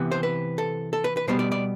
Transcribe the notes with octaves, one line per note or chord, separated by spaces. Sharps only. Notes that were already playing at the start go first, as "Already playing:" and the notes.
Already playing: C3 E3 B3
C5
B4
A4
A4
B4
B4
B2 G3 B3 C5
D5
D5